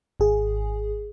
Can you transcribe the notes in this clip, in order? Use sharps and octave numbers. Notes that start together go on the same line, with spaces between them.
G#1 G#4